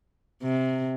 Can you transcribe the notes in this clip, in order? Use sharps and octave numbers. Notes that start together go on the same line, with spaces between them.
C3